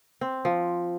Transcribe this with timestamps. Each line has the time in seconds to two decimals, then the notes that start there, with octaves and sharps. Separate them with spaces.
0.21 C4
0.45 F3